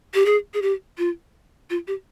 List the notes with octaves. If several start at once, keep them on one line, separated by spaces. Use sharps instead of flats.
G4
G#4
G#4
G4
F4
F4
G4